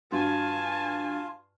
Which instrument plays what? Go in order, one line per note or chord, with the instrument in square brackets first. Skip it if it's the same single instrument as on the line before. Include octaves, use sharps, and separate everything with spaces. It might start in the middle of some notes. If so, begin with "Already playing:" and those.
[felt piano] G2 F#4 [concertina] F4 [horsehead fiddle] G#5 A5